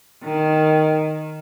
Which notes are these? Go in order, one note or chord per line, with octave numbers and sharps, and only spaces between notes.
D#3